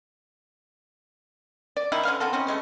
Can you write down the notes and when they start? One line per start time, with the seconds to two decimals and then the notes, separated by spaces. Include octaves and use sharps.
1.77 D5
1.92 D#3 D#4 E4
2.05 D3 C#4 B4 F5
2.20 E3 B3 C4 A4
2.33 C4 C#4 D#4 E4
2.47 E3 G#3 A3 C#4